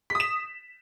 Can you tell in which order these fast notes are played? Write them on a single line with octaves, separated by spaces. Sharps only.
B6 D#6 E7